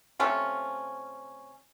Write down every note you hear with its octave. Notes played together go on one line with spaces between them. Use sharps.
C3 A3 C#4 F4